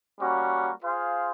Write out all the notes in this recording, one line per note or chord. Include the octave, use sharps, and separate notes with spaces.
G3 A#3 C#4 F#4
F4 G#4 C5 F5